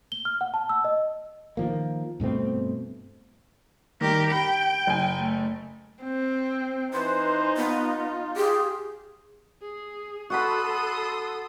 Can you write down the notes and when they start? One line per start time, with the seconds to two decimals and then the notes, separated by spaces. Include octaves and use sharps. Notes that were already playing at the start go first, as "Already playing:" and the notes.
0.12 G7
0.25 F6
0.41 F#5
0.54 A5
0.69 E6
0.85 D#5
1.57 D#3 F3 A#3
2.20 G2 B2 A3 C4
4.01 D#3 G3 G4 A#4
4.31 G5 B5
4.87 F#1 G#5
5.18 A3
6.03 C4
6.93 E3 D#4 B4 C5
7.57 B3 F4
8.36 G4 G#4
9.61 G#4
10.30 F#4 A4 F#5 B5 C6 D#6